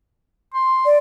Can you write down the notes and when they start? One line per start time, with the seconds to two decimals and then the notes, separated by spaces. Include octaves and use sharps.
0.54 C6
0.85 D5